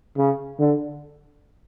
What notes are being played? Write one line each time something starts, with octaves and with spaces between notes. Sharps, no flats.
C#3
D3